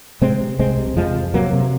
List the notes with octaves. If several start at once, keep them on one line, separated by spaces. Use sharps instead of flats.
C3 G#3 C4
C3
C2 G#3 C4
C3
F2 F3 G#3
F2
C3 F#3 A#3
C3